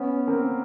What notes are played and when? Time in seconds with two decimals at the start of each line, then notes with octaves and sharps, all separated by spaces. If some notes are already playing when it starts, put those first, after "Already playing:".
Already playing: B3 C#4
0.27 A#3 C4